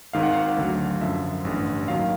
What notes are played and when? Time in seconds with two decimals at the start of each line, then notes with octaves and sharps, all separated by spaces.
0.13 G#1 G#2 D#3 F5
0.23 F#5
0.33 F5
0.57 D2 D3 F#3
1.01 F#2 D3 F3 E5
1.45 A1 G2 D3
1.88 D#2 D#3 F#3 F5